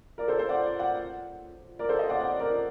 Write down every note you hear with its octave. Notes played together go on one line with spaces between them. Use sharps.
A#4 D5
A4 C5
A4 C5
D5 F#5
D5 F#5
A#4 D5
A4 C5
C5 D#5
D5 F#5
D5 F#5
A#4 D5